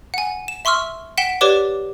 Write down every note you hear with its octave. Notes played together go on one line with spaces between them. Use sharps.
F#5 G#5
E7
E5 C6 C#6 E6 F6
F#5 G5 B6 E7 G7
G4 B4 C#5 D5 D6 G7